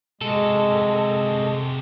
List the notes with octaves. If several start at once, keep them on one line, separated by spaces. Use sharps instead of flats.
C3 G#3 F#4 A4